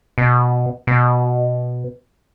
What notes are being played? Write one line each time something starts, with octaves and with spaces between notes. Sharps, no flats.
B2
B2